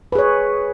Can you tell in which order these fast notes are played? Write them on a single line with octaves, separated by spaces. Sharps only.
B4 G#4 C#5